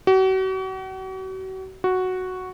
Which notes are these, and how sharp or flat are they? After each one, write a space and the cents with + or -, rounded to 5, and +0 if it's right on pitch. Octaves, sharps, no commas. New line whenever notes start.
F#4 +40
F#4 +0